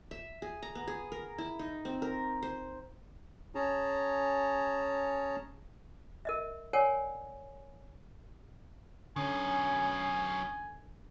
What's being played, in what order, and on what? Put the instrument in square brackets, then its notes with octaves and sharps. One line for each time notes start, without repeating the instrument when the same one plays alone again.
[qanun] E5
G#4
A#5
B3
G#4
A#4
E4
D#4
C4
A#4
C5
[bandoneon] C#4 G#4 C#5 A5 A#5
[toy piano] A#4 D#5 E5
A#4 C#5 D5 F#5 G#5
[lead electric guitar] F#2 B2 [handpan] D3 [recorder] C#4 [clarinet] G#5